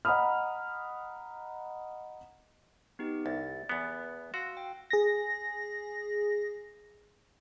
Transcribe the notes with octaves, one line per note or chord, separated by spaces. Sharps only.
D#5 F#5 A#5 B5 D#6 F6
B3 D#4 G4
C2 A6
E2 B3
F#4 F5 C6 E6
G5
G#4 A#6